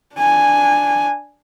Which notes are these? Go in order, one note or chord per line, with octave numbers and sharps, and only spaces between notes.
D4 G#5